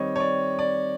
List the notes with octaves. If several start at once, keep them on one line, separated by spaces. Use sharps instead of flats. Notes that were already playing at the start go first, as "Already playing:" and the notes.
Already playing: D#3 G3 C4 C#5 D#5
C#5
D5
D5